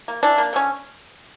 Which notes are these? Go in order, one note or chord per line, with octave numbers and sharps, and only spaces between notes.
A#3
E3 D4
A#3
D3 C#4